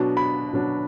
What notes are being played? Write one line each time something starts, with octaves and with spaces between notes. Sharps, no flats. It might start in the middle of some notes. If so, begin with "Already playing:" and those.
Already playing: B2 F#3 D4
B5
B2 F#3 D4